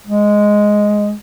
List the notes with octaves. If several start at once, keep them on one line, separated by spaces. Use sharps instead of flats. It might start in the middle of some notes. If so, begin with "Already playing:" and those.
G#3